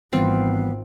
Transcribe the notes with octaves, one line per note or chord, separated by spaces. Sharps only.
G#1 E3 G3 B3 C4 F4 C7